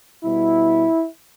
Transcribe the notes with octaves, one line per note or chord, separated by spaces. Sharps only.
B2 G3 E4